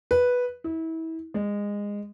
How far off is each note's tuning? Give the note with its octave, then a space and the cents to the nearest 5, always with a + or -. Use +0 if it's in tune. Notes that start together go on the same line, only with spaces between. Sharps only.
B4 -5
E4 -30
G#3 -20